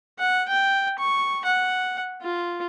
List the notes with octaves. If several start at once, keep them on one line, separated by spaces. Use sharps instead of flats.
F#5
G5
C#6
F#5
F4